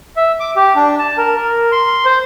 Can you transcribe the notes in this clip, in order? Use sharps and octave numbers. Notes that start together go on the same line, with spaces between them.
E5
D6
G4
D4
A5
A#4
A#4
C6
C5